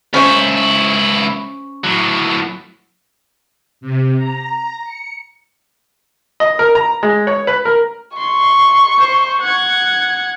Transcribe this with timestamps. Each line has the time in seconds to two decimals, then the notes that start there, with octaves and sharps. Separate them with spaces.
0.14 C#2 C#4 E4 C5 C#5
1.84 A2 F#3
3.81 C3
4.17 A#5
4.84 C#7
6.40 D#5
6.59 A#4
6.75 A#5
7.03 G#3
7.27 C#5
7.47 B4
7.65 A#4
8.17 C6 C#6
8.98 C5
9.41 F#5 G#6